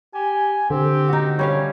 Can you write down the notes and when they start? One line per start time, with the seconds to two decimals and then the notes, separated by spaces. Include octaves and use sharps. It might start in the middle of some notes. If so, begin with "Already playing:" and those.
0.14 G4 G#5
0.70 D3 C4 G4
1.08 D#4 F#4
1.39 G3 C#4 C#5 F5